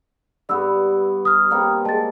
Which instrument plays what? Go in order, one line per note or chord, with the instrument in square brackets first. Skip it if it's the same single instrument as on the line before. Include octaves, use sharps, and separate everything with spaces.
[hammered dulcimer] G2 B3 [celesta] D5 E6
[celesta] D#6 F6
[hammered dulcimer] G3 A#3 C4
[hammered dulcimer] G#3 [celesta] A5 A6